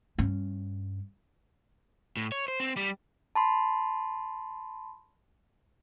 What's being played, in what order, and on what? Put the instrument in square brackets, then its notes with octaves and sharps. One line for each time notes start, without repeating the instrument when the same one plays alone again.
[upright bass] G2 C#4
[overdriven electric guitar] A2
C#5
C5
C4
G3
[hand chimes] A5 B5 C6